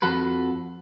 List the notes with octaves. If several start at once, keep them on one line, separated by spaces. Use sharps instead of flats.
F2 F3 F#4 A4 B4